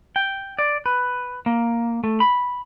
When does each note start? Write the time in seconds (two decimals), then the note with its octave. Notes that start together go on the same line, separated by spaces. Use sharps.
0.16 G5
0.59 D5
0.86 B4
1.46 A#3
2.04 A3
2.20 B5